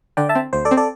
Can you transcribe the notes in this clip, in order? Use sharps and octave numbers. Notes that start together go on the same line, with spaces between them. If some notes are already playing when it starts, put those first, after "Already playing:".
D3 D5 G5
E5 A5
C4
D2 C5
A4 D5
C4
A4 D5